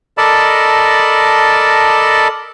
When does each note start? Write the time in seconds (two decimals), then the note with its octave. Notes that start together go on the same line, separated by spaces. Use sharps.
0.18 A4 A#4 D5 D#5 A5 B5